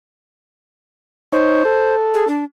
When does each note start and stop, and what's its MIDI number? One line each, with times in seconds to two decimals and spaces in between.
1.33 1.63 63
1.33 1.95 72
1.33 1.63 73
1.65 2.28 69
2.14 2.25 68
2.28 2.44 62